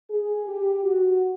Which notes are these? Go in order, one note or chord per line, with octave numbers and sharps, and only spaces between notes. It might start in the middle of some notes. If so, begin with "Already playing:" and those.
G#4
G4
F#4